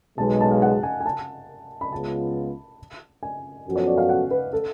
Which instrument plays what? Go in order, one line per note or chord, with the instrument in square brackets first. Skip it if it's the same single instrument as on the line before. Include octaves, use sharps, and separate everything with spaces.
[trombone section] B1 B2 G#3 [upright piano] A5
[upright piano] A5
F5
F#5
G#5
G#5
A5
B5
[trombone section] C#2 C#3 G#3 B3 F4 [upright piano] A5
[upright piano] G#5
[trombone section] F#2 F3 B3 F#4 A4
[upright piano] C#5
D5
F5
F#5
B4
A4